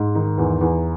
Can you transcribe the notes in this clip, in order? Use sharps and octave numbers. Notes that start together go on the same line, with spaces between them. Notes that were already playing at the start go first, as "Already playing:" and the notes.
Already playing: G#2
D#3 D#4
E2
E2